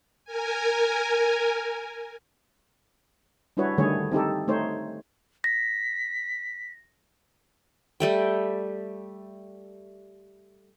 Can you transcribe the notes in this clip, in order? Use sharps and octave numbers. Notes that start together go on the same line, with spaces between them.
A#4 G#5
G3 D4 E4 F#4 B4 C#5
D3 D#3 G3 A3 G#4 C#5
C4 D#4 G4 A4
A3 D#4 C5 C#5
A#6 B6
G3 A3 G5